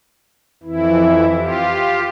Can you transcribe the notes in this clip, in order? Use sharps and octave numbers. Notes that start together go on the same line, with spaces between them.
F2 E3 E4
F4 G4